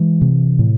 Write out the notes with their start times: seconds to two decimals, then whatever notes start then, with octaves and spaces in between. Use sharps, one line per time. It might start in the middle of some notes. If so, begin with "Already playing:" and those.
Already playing: E3 G#3
0.21 C3
0.59 A2